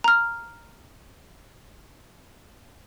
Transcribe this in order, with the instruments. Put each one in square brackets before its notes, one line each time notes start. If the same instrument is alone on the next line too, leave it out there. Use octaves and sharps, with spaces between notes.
[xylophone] A#5 F6